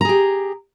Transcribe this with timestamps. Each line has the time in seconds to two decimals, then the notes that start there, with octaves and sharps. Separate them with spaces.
0.01 A#5
0.05 G#4
0.09 G4